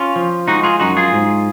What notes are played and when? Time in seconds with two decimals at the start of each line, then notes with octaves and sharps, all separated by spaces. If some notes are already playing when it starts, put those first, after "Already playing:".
Already playing: C#4 F4
0.16 F3
0.48 G#3 D#4 F#4
0.63 F4 G#4
0.80 F#2 D#4 F#4
0.97 F4 G#4
1.13 G#2